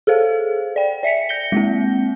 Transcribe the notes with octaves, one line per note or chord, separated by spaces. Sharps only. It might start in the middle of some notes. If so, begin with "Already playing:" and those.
G#4 A4 C5 F5
D5 G5
D5 E5 B6 C#7
G6 A#6 C#7 G7
G#3 A#3 C4